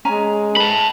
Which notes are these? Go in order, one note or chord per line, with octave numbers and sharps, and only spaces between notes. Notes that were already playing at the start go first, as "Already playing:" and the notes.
G#3 C#4 G#5 A#5
B4 A5 B5